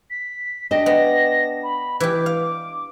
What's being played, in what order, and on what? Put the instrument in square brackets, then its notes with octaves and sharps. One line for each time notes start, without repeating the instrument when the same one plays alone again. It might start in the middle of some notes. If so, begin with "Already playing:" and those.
[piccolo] B6
[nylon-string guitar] D4 D#5 G5 [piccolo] A#6
[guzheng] B3
[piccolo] B5
[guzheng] E3 G4 [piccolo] D6
[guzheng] F5